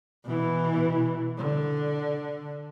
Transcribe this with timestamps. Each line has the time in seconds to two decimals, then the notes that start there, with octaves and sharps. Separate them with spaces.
0.24 B2 E3
1.37 D3